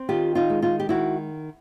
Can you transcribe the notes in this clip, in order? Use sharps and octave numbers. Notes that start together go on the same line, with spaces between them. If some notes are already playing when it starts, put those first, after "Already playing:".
Already playing: C4
D#3 F4 G4
D#4 F4
G#3
D#4 F4
G4
D#3 E4 F#4